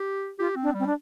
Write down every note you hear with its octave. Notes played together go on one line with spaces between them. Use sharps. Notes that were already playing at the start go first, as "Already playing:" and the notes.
Already playing: G4
F4 G4
C4
D4
G3 C4
D4